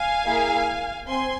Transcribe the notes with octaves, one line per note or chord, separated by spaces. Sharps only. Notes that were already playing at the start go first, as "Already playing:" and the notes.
Already playing: F5 G#5
A#3 E4 G#4
C4 G#5 C6